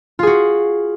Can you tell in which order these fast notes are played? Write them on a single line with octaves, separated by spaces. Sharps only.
F4 G#4 F#4